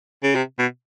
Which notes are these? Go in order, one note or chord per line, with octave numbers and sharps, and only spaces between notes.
C#3
C3
B2